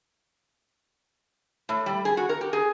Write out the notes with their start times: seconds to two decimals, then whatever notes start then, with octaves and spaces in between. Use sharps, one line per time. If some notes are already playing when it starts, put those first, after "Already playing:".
1.69 A2
1.86 G3
2.05 G#4
2.17 F#4
2.29 A#4
2.41 G4
2.53 G#4